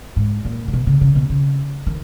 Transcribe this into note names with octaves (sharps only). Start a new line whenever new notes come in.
G#2
A#2
A#2
B2
C#3
C#3
B2
C#3
D#3